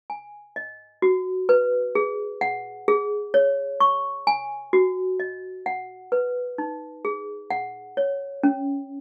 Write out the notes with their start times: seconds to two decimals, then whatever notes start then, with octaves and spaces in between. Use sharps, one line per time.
0.10 G#5
0.56 D#5
1.02 F#4
1.49 B4
1.95 G#4
2.41 F#5
2.88 G#4
3.34 C#5
3.80 C#6
4.27 G#5
4.73 F#4
5.20 D#5
5.66 F#5
6.12 B4
6.58 D#4
7.05 G#4
7.51 F#5
7.97 C#5
8.43 C#4